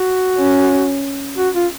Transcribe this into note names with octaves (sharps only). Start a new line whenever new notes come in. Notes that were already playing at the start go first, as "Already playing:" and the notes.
Already playing: F#4
C#4
F#4
F4